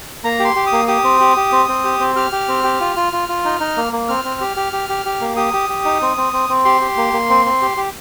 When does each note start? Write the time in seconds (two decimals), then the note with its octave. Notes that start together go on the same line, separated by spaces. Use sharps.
0.24 A#3 A#5
0.39 G4
0.45 C6
0.56 G4
0.67 D#6
0.72 A#3
0.88 G4 D#6
1.04 C4
1.21 G4
1.36 G4
1.52 C4
1.69 C4
1.85 G4
2.00 C4
2.16 G4 F6
2.32 G4
2.48 C4
2.64 G4
2.81 F4
2.96 F4
3.13 F4
3.29 F4
3.45 D#4
3.60 D#4
3.77 A#3
3.93 A#3
4.08 C4 F6
4.24 C4
4.41 G4
4.57 G4
4.73 G4
4.89 G4
5.06 G4
5.21 A#3
5.37 G4 D#6
5.53 G4
5.69 G4
5.85 D#4
6.02 C4
6.17 C4
6.33 C4
6.49 C4
6.65 G4 C6
6.81 G4
6.97 A#3
7.13 A#3
7.30 C4
7.46 C4
7.62 G4
7.77 G4